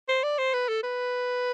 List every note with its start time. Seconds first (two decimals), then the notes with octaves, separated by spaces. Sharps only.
0.09 C5
0.23 D5
0.38 C5
0.54 B4
0.69 A4
0.83 B4